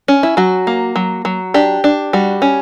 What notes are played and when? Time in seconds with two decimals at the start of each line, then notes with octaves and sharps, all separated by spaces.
0.08 C#4
0.23 E4
0.37 F#3 F#4
0.67 A#3
0.96 F#3
1.25 F#3
1.54 D4 G4
1.84 D4
2.13 G3 F#4
2.42 C#4